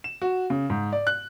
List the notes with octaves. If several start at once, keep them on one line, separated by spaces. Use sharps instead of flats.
E7
F#4
C#3
G#2
D5
F#6